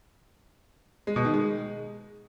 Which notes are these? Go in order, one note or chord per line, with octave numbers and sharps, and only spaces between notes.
G#3
B2
D#3
G#3